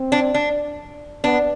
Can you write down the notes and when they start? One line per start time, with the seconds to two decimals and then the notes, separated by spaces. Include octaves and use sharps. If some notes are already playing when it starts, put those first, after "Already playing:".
Already playing: C4
0.12 D4
0.34 D4
1.24 B3 D4